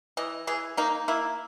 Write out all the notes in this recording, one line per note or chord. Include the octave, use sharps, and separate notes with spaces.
E3 D#5
E3 G#4
A#3 D#4
A#3 E4